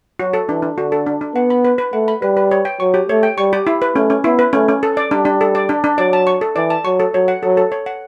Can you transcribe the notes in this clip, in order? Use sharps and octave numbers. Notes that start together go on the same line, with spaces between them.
F#3 F#4
A4
E3 D4
D4
D3 F#4
A4
D4
D4
B3 F#5
B5
B4
B4
A3 F#5
B5
G3 B4
B4
C#5
G5
F#3 C#6
G4
A3 C#5
G5
G3 C#6
G4
E4
B4
A3 C#4
C#4
B3 E4
B4
A3 C#4
C#4
A4
D5
G3 D4
D4
A4
D5
D4
D4
F#3 D5
A5
C#6
A4
E3 D5
A5
F#3 C#6
A4
F#3 C#5
F#5
F#3 A4
A4
C#5
F#5